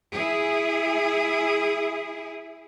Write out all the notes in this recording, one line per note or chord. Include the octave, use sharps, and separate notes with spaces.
E4 G#4